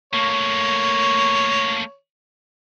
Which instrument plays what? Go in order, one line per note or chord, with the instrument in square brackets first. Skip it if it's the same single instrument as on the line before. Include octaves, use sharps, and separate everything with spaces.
[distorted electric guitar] A3 A#3 [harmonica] C#5